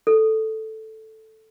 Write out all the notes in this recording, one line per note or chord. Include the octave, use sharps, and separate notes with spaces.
A4